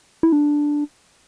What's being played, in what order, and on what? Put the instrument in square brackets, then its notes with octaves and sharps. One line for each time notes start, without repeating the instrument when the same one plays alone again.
[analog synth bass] E4
D4